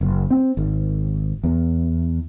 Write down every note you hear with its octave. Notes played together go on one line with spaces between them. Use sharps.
F#1
C4
G#1
E2